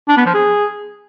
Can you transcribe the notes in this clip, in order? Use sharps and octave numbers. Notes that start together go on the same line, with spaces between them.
D4
B3
F3
G#4